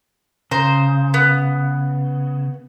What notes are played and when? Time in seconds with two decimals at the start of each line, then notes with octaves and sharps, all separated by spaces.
0.51 C#3 C5 A#5
1.14 B3